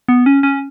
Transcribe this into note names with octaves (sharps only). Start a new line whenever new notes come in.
B3
C#4
C#4